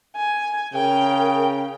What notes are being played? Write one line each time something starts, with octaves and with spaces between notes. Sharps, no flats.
G#5
C#3 A#4 G5